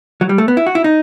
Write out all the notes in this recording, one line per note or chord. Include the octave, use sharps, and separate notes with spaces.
F#3
G3
A3
B3
E4
F#4
E4
D#4